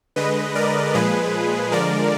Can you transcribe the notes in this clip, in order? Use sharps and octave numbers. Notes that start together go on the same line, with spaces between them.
D3 G#3 B4 D#5
A#4 D5
A#2 F3 G#3 G#4 B4
D3 F3 G#3 A#4 D5